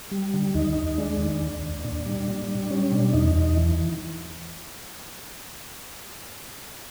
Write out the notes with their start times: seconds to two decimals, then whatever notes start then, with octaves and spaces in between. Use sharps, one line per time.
0.11 G3
0.34 D3
0.55 D#2 D#4
0.77 D#2
0.98 G#3 D4
1.19 D#3
1.41 D#2
1.63 D#2
1.84 A#2 D4
2.06 G3
2.28 A#2
2.48 G3
2.70 G3 C#4
2.92 B2 D4
3.13 E2 D#4
3.35 E2 D#4
3.57 E3